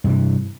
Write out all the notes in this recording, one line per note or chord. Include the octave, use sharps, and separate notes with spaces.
G2 C3 E3